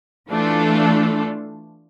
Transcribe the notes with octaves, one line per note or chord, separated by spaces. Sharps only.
E3 A3 D4 F4 A4